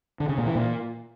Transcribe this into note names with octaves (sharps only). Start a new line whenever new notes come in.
D3
C#3
A#2
E3
A#2